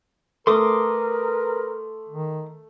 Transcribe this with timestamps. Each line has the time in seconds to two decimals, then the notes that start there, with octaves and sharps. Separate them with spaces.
0.47 A3 A#4 B4 C6 D6 D#6
2.09 D#3